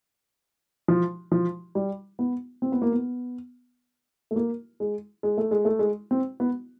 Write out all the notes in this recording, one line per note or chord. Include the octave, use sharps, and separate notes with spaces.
F3
F3
G3
B3
C4
B3
A#3
B3
A3
A#3
G#3
G#3
A3
G#3
A3
G#3
C4
B3